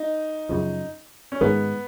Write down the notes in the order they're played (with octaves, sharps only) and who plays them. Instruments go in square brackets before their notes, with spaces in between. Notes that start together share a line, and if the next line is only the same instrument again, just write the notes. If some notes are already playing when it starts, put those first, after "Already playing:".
Already playing: [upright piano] D#4
[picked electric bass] F#2 C#3 F3
[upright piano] C#4
[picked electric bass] G#2 D#3 G#3 [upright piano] B3